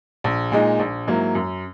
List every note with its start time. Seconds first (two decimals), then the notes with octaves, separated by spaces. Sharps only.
0.24 A#1
0.52 A#2 G#3 D#4
0.79 A#1
1.07 G#2 F#3 A#3 E4
1.35 F#2